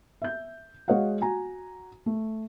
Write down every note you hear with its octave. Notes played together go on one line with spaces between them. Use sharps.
E5 G6
G#3 F#4 C#5 D#5 F5 F#5
F#4 G#5 A#5
A3